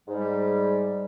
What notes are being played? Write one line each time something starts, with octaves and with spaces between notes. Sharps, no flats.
G#2 G3